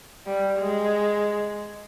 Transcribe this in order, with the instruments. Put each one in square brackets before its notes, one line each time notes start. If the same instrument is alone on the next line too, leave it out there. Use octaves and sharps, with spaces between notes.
[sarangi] G3
G#3